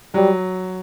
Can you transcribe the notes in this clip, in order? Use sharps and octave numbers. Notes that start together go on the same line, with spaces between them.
F#3 G3